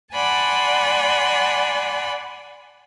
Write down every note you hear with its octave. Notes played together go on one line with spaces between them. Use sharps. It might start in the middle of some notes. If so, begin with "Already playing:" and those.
D5 F#5 G#5 A5 B5 C6